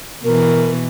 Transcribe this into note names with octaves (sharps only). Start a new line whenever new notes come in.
B2 E3 A#4